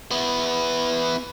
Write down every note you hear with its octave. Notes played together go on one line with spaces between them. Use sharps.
B3 E4